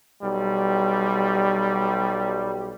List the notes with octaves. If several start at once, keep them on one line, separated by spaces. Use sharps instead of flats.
B1 G3